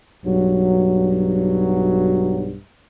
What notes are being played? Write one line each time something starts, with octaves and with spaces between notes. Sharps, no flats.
B1 G2 F#3